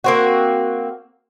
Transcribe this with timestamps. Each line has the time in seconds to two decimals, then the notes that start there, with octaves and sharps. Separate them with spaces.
0.04 A#3 C4 F#4